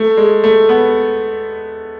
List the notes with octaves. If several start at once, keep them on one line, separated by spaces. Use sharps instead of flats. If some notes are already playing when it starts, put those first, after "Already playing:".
Already playing: A3
G#3
A3
B3